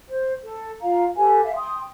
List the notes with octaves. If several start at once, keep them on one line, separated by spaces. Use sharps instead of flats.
C5
A4
F4 F5 A#5
G4 A4 B4 G#5
E5 F5
G5 C6 D#6